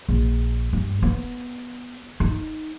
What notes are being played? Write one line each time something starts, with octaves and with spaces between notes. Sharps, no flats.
A#1
G2
B3
D#4